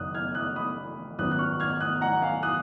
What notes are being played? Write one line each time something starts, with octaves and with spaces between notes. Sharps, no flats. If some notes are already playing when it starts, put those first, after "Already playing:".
Already playing: F#1 F#2 D#3 A#3 D#6 F#6
F6 G#6
D#6 F#6
B5 D#6
G#1 F#2 F3 B3 D#6 F#6
F#6
C#6 F6
F6 G#6
D#6 F#6
F#5 A#5
F5 G#5
D#6 F#6